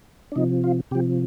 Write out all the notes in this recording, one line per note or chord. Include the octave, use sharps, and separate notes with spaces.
D4
C3 F3 D#4
F4
C3 F3 G4